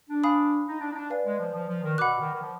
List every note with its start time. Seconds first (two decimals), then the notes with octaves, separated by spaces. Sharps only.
0.09 D4
0.24 F5 G#5 B5 D#6
0.67 D#4
0.81 D4
0.92 D#4
0.96 D4
1.10 B4 D5 F5 G#5
1.25 G#3
1.40 F3
1.54 F3
1.68 F3
1.83 D#3
1.98 B2 F#5 B5 D6 F#6
2.19 D#3
2.34 D#3
2.42 F3